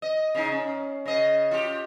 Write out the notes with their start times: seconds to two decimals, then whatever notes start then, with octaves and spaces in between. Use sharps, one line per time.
0.02 D#5
0.35 C#3 D#4
0.52 C#4
1.06 C#3 D#5
1.51 F4 G4